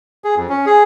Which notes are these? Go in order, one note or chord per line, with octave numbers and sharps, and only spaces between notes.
G#4
F2
C#4
G#4